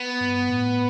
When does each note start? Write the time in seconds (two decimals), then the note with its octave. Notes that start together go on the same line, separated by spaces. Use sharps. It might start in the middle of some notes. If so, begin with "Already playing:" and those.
Already playing: B3
0.21 G2
0.50 A2